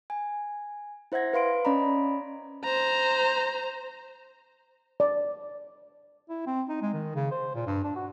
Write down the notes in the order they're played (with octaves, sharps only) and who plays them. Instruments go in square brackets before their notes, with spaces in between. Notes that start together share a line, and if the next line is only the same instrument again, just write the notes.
[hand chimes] G#5
E4 C5 E5 F#5 G#6 A#6
B4 F5 C6 D7
C#4 D5 D#5 A#5 B5
[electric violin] C5 A#5
[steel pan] D5
[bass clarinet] E4
C4
D#4
G#3
D#3
C#3
C5
A#2
G2
D4
F#4